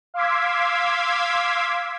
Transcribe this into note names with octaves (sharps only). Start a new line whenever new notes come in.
F5 C6 D6 E6 G#6 B6